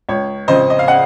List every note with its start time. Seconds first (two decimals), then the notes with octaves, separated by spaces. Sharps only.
0.09 C#2 C#5
0.48 C#3 F3 C4 C5 D#5
0.70 D#5
0.79 F5
0.88 D#5 F#5